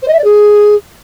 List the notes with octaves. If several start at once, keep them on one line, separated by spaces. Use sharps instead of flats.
C5
D#5
E5
D5
G#4